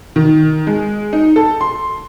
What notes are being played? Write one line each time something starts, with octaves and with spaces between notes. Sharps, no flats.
D#3
G#3
D#4
A4
C6